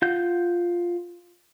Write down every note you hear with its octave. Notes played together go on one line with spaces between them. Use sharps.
F4 F#5 G6